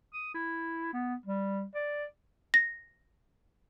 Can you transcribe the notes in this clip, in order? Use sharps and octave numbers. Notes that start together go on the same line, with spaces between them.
D#6
E4
B3
G3
D5
A#6